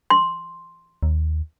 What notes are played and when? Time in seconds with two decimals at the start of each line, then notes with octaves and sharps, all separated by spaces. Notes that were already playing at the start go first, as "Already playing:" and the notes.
0.10 C6
1.03 D#2